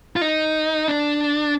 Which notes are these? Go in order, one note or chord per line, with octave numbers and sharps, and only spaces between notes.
F4
D#4
D4